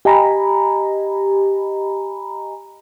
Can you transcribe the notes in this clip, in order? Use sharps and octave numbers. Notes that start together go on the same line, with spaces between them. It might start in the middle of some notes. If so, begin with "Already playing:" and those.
G4 D#5 G#5 A#5 B5